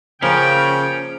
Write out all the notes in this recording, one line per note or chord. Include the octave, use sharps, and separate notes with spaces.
C#3 F3 A#3 C#4 A#4 G5 A5